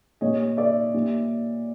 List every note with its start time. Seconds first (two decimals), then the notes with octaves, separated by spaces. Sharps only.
0.21 A#2 G3 C#5 D#5
0.57 D5 E5
0.94 A#2 G3